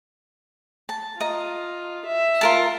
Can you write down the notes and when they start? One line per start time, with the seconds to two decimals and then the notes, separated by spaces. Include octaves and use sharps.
0.89 A5
1.21 F4 D#5 A#5
2.06 E5
2.41 F4 A#4 A5